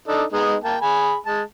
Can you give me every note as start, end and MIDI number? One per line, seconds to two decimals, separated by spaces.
0.08 0.24 62
0.08 0.24 63
0.08 0.24 69
0.32 0.55 56
0.32 0.55 59
0.32 0.55 63
0.64 0.77 58
0.64 0.77 79
0.64 0.77 81
0.82 1.16 68
0.82 1.16 80
0.82 1.16 83
1.26 1.42 56
1.26 1.42 81